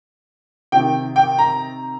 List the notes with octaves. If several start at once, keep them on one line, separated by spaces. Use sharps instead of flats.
C3 D#3 G5
G5
A#5